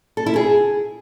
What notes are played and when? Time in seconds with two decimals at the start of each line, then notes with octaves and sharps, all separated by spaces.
0.17 A4
0.26 E4
0.36 G#4